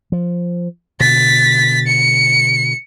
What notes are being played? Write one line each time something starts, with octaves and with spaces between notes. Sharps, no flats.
F3
B2 D3 A6 B6
C#7